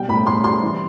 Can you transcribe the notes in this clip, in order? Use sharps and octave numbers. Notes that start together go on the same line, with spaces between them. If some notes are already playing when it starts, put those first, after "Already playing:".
Already playing: B2 G3 G5
A2 B5
A2 C6
G3 C6
E3